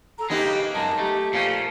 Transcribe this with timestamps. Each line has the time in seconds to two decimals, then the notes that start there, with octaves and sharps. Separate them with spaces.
0.18 A4 A#5
0.30 G#3 A#3 B3 D#4 G4
0.45 C#3
0.75 F#2 G#3 D#5 A5 A#5
0.99 A3 G4
1.33 A#2 F3 A3 C#4